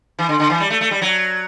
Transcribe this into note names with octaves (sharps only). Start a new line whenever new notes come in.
E3
D3
D3
E3
G3
A3
A3
G3
F#3